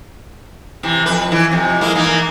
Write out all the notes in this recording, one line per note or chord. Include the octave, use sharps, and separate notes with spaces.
C3 E3
F2 B4
E3
F2 C3
G#3 A#3 E4
E3 A#3 D#4